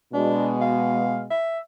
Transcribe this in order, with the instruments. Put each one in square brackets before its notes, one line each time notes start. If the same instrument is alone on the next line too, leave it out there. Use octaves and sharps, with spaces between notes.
[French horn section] B2 G#3 [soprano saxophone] D4
[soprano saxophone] F5
E5